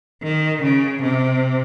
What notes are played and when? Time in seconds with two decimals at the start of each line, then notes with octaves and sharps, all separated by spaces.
0.23 D#3
0.63 C#3
1.02 C3